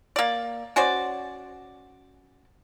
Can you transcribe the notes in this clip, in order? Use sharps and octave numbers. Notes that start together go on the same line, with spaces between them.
A#3 D5
C#4 F#4 C5 D5